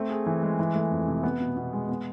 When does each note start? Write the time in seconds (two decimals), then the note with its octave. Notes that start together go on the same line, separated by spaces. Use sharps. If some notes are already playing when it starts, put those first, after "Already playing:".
Already playing: A3 C4
0.09 G#4
0.26 E3
0.43 G#3
0.59 E3
0.75 A3
0.91 F2
1.07 C3
1.23 B3
1.40 B2
1.57 B2
1.73 G#3
1.89 B3